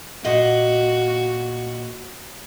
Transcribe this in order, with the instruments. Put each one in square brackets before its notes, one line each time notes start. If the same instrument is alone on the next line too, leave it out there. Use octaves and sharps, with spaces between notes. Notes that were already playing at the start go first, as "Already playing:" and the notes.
[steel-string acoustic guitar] A#2 D#5 F#5 [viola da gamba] F#4